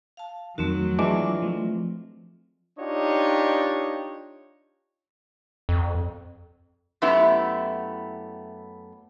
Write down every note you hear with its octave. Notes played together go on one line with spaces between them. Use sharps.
F5 A5
F2 D#3 F#3 A3 C4 F#4
E3 G#3 C4 D4 F4 D6
F3 A3
D4 D#4 F4 G4 C#5 D#5
F2
F#2 A3 B3 E4 G4